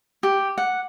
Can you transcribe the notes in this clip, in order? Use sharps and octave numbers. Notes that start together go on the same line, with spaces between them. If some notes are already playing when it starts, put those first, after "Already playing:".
G4
F#5